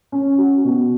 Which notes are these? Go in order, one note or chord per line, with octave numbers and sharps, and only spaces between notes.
C#4
F#4
B2